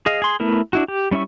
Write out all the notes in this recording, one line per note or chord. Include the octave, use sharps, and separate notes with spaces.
G#4 D#5 F5
G#4 C6
A3 B3 E4 A#4
D4 E4 F#4
G4
G3 C#4 E4 E5 C#6